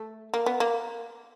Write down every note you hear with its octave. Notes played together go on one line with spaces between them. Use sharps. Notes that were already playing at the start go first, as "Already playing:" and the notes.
Already playing: A3
A#3
B3
A#3